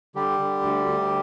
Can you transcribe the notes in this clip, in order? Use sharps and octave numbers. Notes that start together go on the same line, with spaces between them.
D3 G3 G4
D3
D2
D2